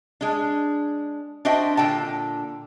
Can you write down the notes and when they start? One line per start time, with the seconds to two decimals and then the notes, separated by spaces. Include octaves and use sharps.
0.21 G#3 D4
1.45 D4 F#4 C5 D#5 E5 G5
1.77 A#2 D3 G5 A5